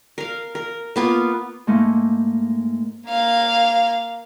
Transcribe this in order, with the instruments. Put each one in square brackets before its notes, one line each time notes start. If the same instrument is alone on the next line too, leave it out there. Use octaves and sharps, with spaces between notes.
[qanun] A#4 F5
A#4
A#3 B3 F4
[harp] G#2 A3 A#3 D#4
[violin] A#3 F5